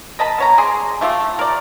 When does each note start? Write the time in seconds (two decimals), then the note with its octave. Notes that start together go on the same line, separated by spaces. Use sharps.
0.19 A#4 D#5 A5 B5
0.38 B3 C#5 A#5
0.58 G#4 D5 C6
1.01 A3 F4 G4 E5
1.39 A#4 D5